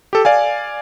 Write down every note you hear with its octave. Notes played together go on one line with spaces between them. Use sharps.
G4 A4
D5 F5 G#5